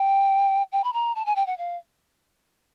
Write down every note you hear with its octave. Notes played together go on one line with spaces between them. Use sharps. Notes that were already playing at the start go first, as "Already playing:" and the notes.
Already playing: G5
G5
B5
A#5
A5
G#5
G5
F#5
F5